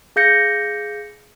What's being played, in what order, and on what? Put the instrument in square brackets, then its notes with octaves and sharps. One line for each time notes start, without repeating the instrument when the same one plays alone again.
[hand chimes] G#4 F5 G6 A#6 C#7